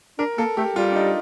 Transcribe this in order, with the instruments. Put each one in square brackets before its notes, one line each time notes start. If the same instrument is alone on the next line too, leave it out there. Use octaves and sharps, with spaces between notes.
[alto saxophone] D4 [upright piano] A#4
[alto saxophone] A#3 [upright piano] A4
[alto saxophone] A3 [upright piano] G4
[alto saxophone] G3 [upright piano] F4
[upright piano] D4
D#4